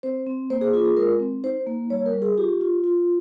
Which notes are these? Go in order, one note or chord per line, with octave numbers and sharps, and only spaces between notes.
C4 C5
C4
A#3 C5
G#4
F4 G#4
G#4
G#3 A#4
C4
D#4 C5
A#3
G3 C#5
A#4
G3
G#4
F4 G4
F4
F4